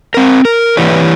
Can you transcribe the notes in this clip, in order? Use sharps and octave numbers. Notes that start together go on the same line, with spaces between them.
C4 A#4
A#4
E3 E4 G4 B4 C#5 D5